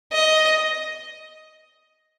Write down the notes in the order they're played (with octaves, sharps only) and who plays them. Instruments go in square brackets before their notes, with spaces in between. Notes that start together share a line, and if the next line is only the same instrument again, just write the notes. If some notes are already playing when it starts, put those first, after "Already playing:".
[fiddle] D#5